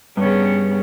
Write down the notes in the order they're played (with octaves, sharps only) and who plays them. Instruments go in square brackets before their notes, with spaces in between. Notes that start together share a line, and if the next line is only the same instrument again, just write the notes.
[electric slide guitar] G2 [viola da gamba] C#3 B3 C#4